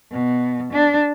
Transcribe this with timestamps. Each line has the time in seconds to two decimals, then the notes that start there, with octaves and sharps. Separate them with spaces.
0.11 B2
0.71 D4